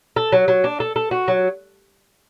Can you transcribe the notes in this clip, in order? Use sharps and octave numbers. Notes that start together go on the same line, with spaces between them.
A4
F#3
F#3
D4
A4
A4
F#4
F#3